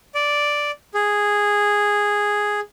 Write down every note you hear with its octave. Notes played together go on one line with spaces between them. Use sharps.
D5
G#4